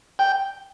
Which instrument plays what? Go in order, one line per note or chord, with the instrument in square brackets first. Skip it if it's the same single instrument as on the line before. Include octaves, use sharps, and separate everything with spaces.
[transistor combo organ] G5